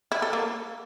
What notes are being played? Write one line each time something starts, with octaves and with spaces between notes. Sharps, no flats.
E4
A4
A#3